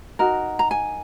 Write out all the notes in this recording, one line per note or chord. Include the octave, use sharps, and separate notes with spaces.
D#4 F#4 A#4
A#5
G#5